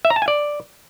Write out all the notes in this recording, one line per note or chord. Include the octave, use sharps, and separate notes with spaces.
E5
A#5
A5
G#5
D5